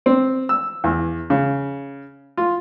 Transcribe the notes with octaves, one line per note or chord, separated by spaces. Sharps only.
C4
E6
E2
C#3
F4